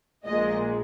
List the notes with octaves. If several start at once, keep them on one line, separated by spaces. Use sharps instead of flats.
A#1 A#2 G#3 D#5